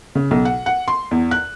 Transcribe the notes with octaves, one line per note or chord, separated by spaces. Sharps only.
C#3
B1
F#5
F#5
C6
E2
F#6